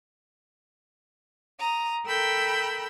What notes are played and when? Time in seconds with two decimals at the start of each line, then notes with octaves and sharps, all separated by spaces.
1.59 A#5 D#6
2.06 A4 A#4 G5 B5 E6 G6